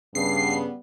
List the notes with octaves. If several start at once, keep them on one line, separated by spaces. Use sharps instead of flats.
G2 C#3 G3 B3 C7